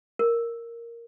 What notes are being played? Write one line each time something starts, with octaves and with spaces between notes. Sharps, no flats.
A#4